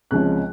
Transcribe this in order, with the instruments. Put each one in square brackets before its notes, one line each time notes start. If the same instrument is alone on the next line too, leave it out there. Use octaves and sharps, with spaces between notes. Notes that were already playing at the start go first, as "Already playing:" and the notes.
[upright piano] C#2 C3 F3 G#3 C#4 F#6